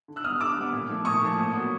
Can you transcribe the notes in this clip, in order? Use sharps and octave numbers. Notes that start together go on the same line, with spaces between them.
D3
E6 F#6
G3 B3 D#6 F6
D3 D6 E6
G3 B3
A#2
F3 A3
A#2 C#6 D#6
F3 A3
A#2
F#3 B3